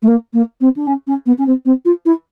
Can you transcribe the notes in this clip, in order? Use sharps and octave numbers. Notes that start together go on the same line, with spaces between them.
A3
A#3
A#3
C4
D4
C#4
C#4
B3
C#4
C4
C4
F4
E4